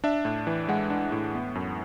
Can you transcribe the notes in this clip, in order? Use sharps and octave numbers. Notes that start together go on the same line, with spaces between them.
D4 E5
A2
E3
G#3 F#5
D4
A2
B3
F#2